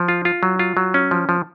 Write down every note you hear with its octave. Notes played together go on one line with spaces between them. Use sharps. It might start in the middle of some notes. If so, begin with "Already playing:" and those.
Already playing: F3
F4
F4
F#3
F4
F#3
C#4
F3
F3